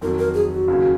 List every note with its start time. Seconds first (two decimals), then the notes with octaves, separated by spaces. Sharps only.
0.01 F2 D#3 F#3 A#4
0.18 A#4
0.34 G#4
0.52 F#4
0.68 D#2 C#3 F#3